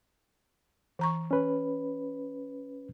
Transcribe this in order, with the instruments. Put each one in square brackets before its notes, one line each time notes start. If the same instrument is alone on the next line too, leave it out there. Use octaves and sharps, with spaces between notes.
[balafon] E3 A#5 C#6
[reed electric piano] C#4 B4